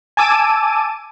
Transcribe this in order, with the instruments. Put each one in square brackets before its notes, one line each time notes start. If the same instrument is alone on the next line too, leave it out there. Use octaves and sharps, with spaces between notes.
[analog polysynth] G#5 A5 D6 E6 D#7